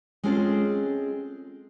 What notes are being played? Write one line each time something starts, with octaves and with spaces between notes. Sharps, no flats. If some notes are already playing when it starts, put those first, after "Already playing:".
G#3 C4 C#4 F4 G#4 A4